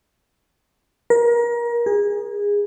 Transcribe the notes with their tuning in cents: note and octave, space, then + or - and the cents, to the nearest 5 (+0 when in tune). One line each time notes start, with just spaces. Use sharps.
A#4 +30
G#4 -20